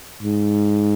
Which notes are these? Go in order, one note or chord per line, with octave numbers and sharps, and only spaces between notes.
G#2